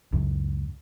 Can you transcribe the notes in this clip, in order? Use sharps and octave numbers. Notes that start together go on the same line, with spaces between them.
C#2 F#2